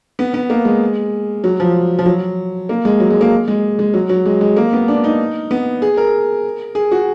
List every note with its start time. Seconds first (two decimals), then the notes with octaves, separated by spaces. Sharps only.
0.19 B3
0.34 B3
0.50 A#3
0.65 G#3
1.44 F#3
1.60 F3
1.99 F3
2.06 F#3
2.69 A#3
2.85 G#3
3.00 F#3
3.10 G#3
3.21 A#3
3.48 G#3
3.79 G#3
3.94 F#3
4.09 F#3
4.26 G#3
4.41 G#3
4.56 A#3
4.73 B3
4.88 D4
5.04 D#4
5.51 B3
5.82 G#4
5.97 A#4
6.75 G#4
6.92 F#4